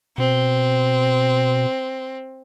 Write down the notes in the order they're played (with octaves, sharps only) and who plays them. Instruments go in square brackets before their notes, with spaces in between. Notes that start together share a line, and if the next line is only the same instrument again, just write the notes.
[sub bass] B2 [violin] C4